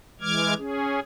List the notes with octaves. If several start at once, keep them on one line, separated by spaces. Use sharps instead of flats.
E3 G#3 D6 F6 G#6
C#4 G#4